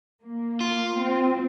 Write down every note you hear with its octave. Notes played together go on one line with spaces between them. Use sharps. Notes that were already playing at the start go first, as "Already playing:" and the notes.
A#3
F4
C4